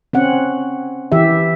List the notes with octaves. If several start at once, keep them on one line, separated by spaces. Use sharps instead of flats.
C4 C#4 F#5
E3 G4 E5